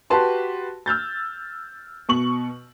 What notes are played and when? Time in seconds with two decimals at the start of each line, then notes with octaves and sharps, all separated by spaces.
0.10 F#4 G4 B4 A5 C6
0.86 E6 F6 G6 A6
2.09 B2 C#6 F#7